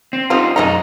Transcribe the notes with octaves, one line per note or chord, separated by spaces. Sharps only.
C4
D3 G3 D#4 F4 C5
F#2 G#3 D#4 D#5 A#5